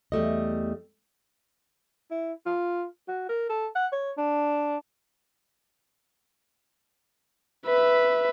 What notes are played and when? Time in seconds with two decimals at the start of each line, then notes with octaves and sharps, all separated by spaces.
0.12 E2 G3 A3 D#5
2.11 E4
2.46 F4
3.08 F#4
3.29 A#4
3.50 A4
3.76 F#5
3.93 C#5
4.18 D4
7.66 B4 E5